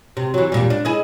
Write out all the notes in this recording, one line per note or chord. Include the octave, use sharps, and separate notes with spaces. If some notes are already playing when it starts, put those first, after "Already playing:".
C3
E3 F#3
E2 A#2 G3
D4
E4 G#4 D#5